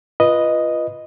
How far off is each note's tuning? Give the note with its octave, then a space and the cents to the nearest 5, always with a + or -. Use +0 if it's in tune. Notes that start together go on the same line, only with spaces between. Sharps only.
F4 -20 B4 -10 D#5 +0